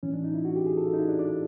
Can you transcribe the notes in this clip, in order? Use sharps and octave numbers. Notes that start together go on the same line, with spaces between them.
A2 E3 C#4
D4
D#4
E4
F#4
G4
G#4
A4
F4
D#4
E4
D4
D4